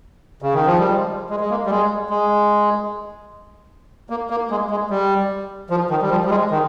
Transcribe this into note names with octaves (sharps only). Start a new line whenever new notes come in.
C#3
D#3
F3
G3
G#3
G#3
G#3
A#3
G3
G#3
G#3
A#3
A#3
G#3
G#3
G3
F3
D#3
G3
F3
G3
G#3
D#3